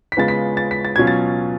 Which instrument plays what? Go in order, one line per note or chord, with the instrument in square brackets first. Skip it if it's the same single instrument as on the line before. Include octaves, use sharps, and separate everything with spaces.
[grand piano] B6
C#3 G#3 B3 F4 A6
B6
A6
B6
A6
B2 F#3 C#4 F4 G#6
A6